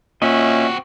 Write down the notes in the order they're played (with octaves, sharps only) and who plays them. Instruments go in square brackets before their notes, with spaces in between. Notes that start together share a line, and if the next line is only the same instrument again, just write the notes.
[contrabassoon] A#2 [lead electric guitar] C4 F#4 [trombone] C#4 [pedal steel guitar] D#5 E5